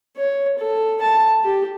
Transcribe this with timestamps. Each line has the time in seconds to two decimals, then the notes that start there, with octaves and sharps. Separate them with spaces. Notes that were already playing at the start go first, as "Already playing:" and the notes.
0.17 C#5
0.59 A4
1.02 A5
1.44 G4